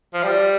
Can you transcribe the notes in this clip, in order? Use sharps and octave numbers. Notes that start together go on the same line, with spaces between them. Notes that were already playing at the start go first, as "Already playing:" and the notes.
F3
G3